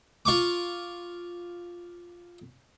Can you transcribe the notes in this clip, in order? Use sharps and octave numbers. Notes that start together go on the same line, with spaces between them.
F4 C#6 D6